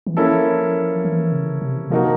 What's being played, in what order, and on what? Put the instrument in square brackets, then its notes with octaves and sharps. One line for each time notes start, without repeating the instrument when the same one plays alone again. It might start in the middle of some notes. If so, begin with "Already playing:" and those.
[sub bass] E3
[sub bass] F3 [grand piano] A#3 C#4 E4 A4
[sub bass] E3
C#3
C3
[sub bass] C3 [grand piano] F3 A#3 D#4 F#4 A#4